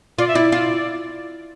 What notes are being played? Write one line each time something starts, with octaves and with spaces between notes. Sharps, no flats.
F4 D5
E5
E4 D5
F4